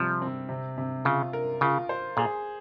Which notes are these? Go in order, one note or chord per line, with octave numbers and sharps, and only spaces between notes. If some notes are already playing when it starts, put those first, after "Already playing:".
Already playing: C3 F3 G3
C4
C3
C3
C#3 F4
A#4
C#3 F4
C5
A#2 G#4